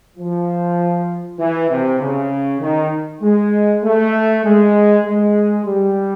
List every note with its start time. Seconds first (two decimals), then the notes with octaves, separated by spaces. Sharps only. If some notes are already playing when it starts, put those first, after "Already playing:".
0.17 F3
1.39 E3
1.70 C3
2.00 C#3
2.61 D#3
3.22 G#3
3.83 A3
4.44 G#3
5.05 G#3
5.65 G3